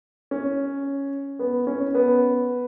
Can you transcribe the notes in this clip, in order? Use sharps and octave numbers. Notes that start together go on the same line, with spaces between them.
C#4
B3
C#4
B3